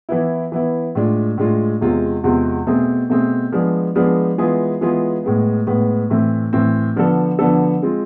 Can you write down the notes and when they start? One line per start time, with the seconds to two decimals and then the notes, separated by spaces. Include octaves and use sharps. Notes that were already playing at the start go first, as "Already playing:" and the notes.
0.09 E3 B3 E4
0.52 E3 B3 E4
0.95 A2 G#3 D4 F4
1.38 A2 G#3 D4 F4
1.81 E2 C3 G#3 C4 F4
2.24 E2 C3 G#3 C4 F4
2.67 B2 A3 C4 G#4
3.10 B2 A3 C4 G#4
3.52 F3 G#3 B3 D4 G#4
3.95 F3 G#3 B3 D4 G#4
4.38 E3 G#3 B3 F4 G#4
4.81 E3 G#3 B3 F4 G#4
5.24 A2 G#3 B3
5.67 A2 G#3 B3
6.10 A2 E3 A3 C4
6.53 A2 E3 A3 C4
6.96 D3 F3 B3 D4 A4
7.39 D3 F3 B3 D4 A4
7.82 G#3 C4 F4